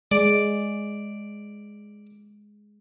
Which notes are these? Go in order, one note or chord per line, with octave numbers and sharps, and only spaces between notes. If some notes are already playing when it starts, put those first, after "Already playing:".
G#3 D5